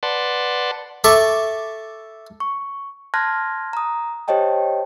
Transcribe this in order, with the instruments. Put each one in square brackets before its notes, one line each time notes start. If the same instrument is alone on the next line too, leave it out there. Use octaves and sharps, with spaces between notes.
[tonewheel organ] B4 D5 F#5 A5 C6
[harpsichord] A4 E5 C#6 D6
[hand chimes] C#6
A5 C6 F6 F#6 G#6 A#6
A#5 D#6
G4 C5 C#5 D#5 G5 A5